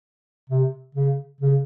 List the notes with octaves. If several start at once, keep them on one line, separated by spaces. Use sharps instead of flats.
C3
C#3
C#3